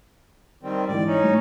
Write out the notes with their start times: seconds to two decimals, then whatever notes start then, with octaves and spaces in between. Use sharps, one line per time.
0.63 D#3 G3 C4
0.88 G#2 D#3 E3 D5
1.07 C#4 D#4
1.23 A2 F#3